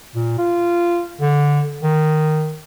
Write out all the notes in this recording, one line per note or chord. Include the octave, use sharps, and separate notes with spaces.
A#2
F4
D3
D#3